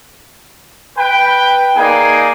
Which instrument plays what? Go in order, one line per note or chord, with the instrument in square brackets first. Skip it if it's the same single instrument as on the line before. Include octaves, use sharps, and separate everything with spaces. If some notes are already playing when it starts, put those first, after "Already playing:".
[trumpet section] B4 G5
A#3 D#4 G#4 D5 G#5